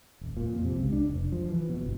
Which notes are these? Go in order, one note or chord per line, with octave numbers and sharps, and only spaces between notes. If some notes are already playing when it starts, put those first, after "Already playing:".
D#1
A#2
F2
C3
C#2
D4
F1
F3
E3
B2
G1